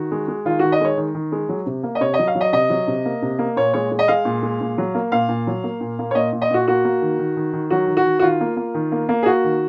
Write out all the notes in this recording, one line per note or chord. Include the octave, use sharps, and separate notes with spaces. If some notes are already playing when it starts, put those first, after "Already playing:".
Already playing: D#3 F#4
G#3
G#3
D#3 F4
D#3 F#4
D#5
G#3 C#5
D#3
D#3
G#3
F#3
C3
A#3
D#5
C3 C#5
D#5
F#3
F5
F#3
D#5
C3 D#5
F#3
C3
A#3
C3
A#3
A#2 C#5
G#3 C#5
G#3
D#5
G#3 F5
A#2
G#3
A#2
F#3
A#3
A#2 F5
A#2
F#3
A#3
A#2
A#3
C#5
A#2 D#5
A#2
D#5
A#2 F#4
A#3 F#4
A#3
D#3
D#3
D#3
D#3
F#3 F#4
D#3
F#4
D#3
F#4
D#3 F4
A#3
A#3
D#3
A#3
A#3
G#4
A#3 F#4
D#3